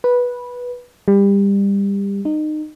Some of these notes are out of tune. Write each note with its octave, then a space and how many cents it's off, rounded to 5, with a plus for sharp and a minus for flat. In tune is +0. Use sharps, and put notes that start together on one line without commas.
B4 -10
G3 +25
D#4 -25